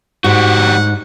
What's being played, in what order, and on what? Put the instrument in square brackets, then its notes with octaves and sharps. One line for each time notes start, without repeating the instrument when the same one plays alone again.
[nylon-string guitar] G#2 [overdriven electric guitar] G3 F#4 [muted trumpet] F#5